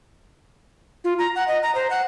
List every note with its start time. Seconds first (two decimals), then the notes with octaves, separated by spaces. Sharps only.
1.04 F4
1.19 A#5
1.36 F#5
1.48 D#5
1.63 A#5
1.75 C5
1.90 F#5